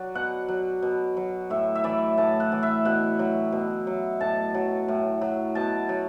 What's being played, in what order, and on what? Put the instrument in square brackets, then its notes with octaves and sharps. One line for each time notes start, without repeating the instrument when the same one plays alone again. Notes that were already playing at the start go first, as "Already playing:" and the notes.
Already playing: [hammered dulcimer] F#3 D5
B2 F#5
F#3
B2
F#3
A2 E5
E5
E3 D5
A2 A5
F#5
E3
E5
B2 F#5
F#3
B2
F#3
A2 A5
F#3
A2
F#3
B2 A5
F#3